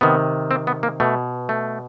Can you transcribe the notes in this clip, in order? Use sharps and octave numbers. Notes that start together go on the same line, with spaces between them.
C3 D#3 B3
C4
B3
A#3
B2 A3
A3